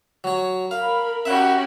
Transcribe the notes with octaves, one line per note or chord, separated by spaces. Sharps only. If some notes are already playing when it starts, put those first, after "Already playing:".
F#3 C#5
A#4 F5 B5
C#4 F#4 G4 E5 F#5